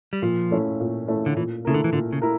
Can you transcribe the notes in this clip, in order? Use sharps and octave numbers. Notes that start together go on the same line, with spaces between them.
G3
A#2 F3
A3 C#4 E4
A#2
A3 C#4 E4
D3
A#2 E3
C#3 A3 E4 A#4
D3
E3
A#2 D3
C#3
E4 A#4